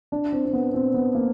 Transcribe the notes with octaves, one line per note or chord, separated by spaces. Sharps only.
D4
C4
C4
B3
C4
B3
A#3